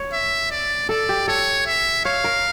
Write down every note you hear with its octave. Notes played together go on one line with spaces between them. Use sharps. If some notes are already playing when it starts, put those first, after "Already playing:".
Already playing: C#5
E5
D5
A4 D5
G4
A4 C#5
E5
C#5 F5
A#4